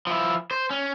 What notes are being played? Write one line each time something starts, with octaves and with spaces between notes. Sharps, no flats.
F3 E4
C5
C#4